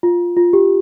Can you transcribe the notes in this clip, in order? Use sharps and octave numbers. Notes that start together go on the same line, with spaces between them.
F4
F4
G4